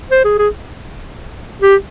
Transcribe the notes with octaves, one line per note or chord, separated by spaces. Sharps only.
C5
G#4
G#4
G4